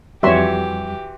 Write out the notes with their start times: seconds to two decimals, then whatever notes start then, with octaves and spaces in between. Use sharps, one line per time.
0.23 F2 E3 G3 F#4 G4 C#5 E5 C6